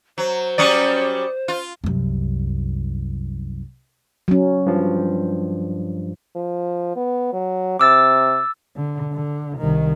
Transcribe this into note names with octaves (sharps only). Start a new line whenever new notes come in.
F#3 C5
F#3 G3 C#4 D5 D#6 C#7
F4
C2 F#2
F#3 C#4
G2 F3
F3
B3
F#3
C3 D6 E6 A6
D3
D3
C2 D#3